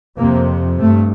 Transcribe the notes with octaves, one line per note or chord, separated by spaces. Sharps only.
F2 C3 A#3
G2 A3